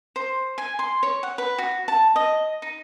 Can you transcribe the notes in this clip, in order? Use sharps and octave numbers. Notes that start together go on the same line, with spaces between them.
C5
G#5
C6
C#5
F#5
B4
F#4
A5
D#5
D#4